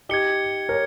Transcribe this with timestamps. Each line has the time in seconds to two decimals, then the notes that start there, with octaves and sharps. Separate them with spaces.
0.09 D#4 G4 G#6 C#7 G7
0.69 A#4 C#5